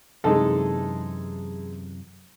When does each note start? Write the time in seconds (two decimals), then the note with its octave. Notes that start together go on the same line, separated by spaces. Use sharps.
0.24 F#2 C3 E3 G#3 D#4 A4